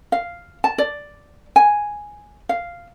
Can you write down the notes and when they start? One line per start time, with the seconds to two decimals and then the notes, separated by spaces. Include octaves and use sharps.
0.12 F5
0.64 A5
0.78 D5
1.56 G#5
2.49 F5